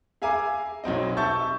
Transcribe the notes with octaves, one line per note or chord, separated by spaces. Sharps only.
G#4 E5 F5 G#5 A#5 D6
B1 F#3 C4 D#5
E5 A5 C#6 G6 A6